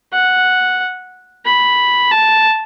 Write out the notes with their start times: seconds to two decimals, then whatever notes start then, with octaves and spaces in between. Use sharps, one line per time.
0.13 F#5
1.46 B5
2.11 A5